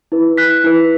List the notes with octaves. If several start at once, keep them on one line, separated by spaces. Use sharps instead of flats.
E4 B4
F#6 B6
E4 B4